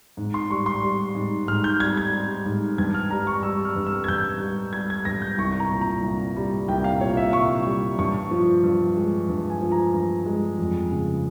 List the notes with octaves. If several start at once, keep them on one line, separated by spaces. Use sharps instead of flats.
G#2
C6
G3 C#6
C6
G3
G#2
G#2 F6
G6
G3 G#6
G#6
G3
G#2
G2 G#6
F6
G3 A#5
C#6
G3 E6
F6
G2
E6
G#6
G2 G6
G3
G3 G#6
G#6
G2 A#6
G6
C2 C#6
A#5
A#2
A#5
C2
G3
C2 G5
F5
A#2 C#5
E5
C2 C#6
G3
G2 C#6
F3
G2
G#3
G2
G#5
F3
A#5
G2
G#3
F2
C#3